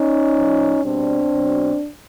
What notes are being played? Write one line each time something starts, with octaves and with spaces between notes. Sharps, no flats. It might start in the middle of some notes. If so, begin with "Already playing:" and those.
Already playing: C#4 D#4
A2 F3
B2 G3 C4 D4
B2 F#3